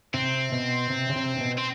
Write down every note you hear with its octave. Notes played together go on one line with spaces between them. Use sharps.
C3 C4
B2
C3
C#3
C3
C3
B2
C4